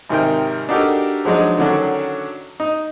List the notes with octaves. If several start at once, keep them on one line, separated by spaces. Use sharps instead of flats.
G#1 C3 D#3 A#4 G5
D4 D#4 F#4 G4 A4 A#4
F3 F#3 G#3 D4 D#4
D3 D#3 F#3 C#4 D4 F#4
D#4